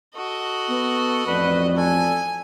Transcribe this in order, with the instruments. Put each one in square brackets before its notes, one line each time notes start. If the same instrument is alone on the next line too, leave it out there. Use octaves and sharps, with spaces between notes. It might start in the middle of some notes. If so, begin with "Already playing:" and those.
[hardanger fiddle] F#4 D#5 [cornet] A4
[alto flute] B3
[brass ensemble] A1 F2 [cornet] B4 [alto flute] D5
[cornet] A4 [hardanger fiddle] G#5